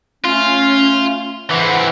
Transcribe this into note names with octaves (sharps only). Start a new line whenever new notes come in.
A3 C#4 F4
E3 C4 E5 F#5